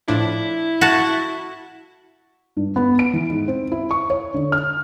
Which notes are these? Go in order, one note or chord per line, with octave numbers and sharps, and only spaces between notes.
A2 F3 D4 E4
F#4 A5
G2
B3
D7
E3
G#2
C4
E4
C#6
C#5
D3
F6